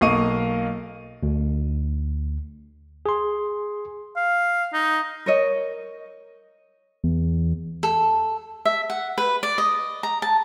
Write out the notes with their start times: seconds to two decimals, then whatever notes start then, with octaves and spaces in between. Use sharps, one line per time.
0.01 B1 A#3 D#5 F5 C#6 D#7
1.23 D2
3.06 G#4 C6
4.16 F5
4.73 D#4
5.26 A#4 C#5 D#5
7.04 E2
7.83 A4
8.65 E5
8.90 F#5
9.18 B4
9.43 D5
9.58 D#5
10.03 A#5
10.22 A5